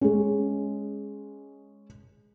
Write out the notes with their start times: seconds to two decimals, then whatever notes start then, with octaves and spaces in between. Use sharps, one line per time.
0.01 G#3 C#4